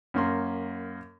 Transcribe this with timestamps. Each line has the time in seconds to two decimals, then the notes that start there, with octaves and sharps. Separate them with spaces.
0.14 F#2 A#3 C6